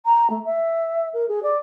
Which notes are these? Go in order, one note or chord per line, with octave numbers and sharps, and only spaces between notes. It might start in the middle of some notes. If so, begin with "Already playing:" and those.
A#5
A3
E5
A#4
G#4
D5